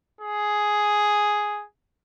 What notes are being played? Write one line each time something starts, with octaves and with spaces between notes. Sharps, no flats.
G#4